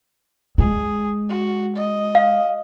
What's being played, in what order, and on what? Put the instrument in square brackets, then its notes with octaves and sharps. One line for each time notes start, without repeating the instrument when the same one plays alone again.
[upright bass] G#3 [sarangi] G#4
[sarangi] F#4
D#5
[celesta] F5